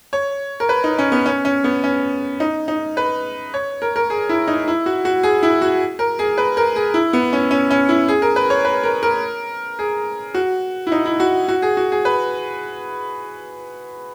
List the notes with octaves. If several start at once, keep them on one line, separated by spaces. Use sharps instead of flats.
C#5
A#4
B4
D#4
C#4
B3
C#4
C#4
B3
C#4
D#4
D#4
B4
C#5
A#4
A#4
G#4
E4
D#4
E4
F#4
F#4
G#4
E4
F#4
A#4
G#4
B4
A#4
G#4
E4
B3
C#4
C#4
C#4
E4
G#4
A#4
B4
C#5
B4
A#4
A#4
G#4
F#4
E4
D#4
E4
F#4
F#4
G#4
F#4
G#4
B4